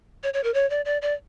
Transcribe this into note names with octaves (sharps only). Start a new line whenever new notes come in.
C#5
C#5
A#4
C#5
D5
D5
D5